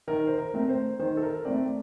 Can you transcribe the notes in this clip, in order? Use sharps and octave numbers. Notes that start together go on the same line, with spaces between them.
D#3 A#4
C5
A#4
A3 C4
C5
D#3 C5
A4
A#4
A3 C4 D5